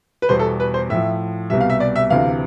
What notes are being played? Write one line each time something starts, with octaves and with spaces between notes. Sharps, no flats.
B4
E2 B2 G3 C5
A4
B4
C5
A2 F3 E5
C2 B2 G3 E5
F5
E5
D5
E5
D2 C3 E3 F5